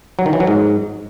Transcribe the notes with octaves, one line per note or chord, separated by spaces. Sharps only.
F#3
D#3
E3
F#3
G#2